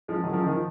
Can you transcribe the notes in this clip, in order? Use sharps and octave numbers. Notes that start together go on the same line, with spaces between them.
F3 G#3
D#3 F#3
C#3 F3
D#3
F3